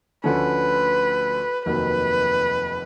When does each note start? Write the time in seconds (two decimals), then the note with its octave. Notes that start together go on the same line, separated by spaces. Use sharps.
0.24 D2 D3 F3 A3 C#4 B4
1.66 F1 D#2 D#3 F#3 B4